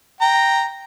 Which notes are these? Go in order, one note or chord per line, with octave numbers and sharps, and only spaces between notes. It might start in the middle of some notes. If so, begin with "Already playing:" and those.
G5 A#5